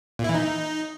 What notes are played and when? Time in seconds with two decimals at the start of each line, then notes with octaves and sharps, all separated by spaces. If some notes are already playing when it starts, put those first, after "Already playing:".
0.19 A#2
0.24 E4
0.29 E3
0.34 D#4